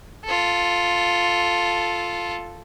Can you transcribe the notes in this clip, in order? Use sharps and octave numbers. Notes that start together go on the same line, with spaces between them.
F4 A4